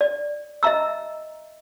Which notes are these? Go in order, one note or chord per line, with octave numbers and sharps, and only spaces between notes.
D5
D#5 E5 A#5 E6